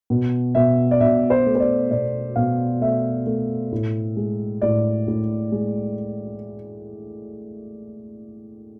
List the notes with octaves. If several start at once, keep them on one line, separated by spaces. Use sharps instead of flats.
B2
B2 E5
D5
B2 E5
C5
A3
C5
D5
B2 D5
B2 F5
A3 E5
A3
A2
G#3
A2 D5
A2
G#3